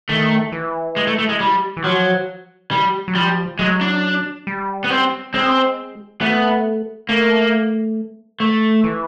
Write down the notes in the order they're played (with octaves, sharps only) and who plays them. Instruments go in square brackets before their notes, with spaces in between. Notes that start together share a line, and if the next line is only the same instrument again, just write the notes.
[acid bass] D#3 [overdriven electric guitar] A3
[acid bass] E3
[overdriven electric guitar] G#3
A3
A3
G#3
G3
[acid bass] E3
[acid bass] F3 [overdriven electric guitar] F#3
[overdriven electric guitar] G3
[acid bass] F#3
[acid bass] F3 [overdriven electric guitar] G3
[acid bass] F#3 [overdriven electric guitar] G#3
[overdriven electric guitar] D4
[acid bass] G3
[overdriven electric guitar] B3
C4
[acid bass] G#3 [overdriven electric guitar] C4
[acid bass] A3 [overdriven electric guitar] B3
[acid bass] A3 [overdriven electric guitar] A#3
[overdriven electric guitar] A3
[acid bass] E3